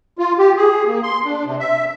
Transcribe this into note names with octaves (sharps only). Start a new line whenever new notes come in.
F4
G4
G#4
A#3
C6
D4
C3
E5